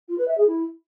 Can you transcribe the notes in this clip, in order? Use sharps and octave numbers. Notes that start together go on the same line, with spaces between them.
F4
B4
E5
G#4
E4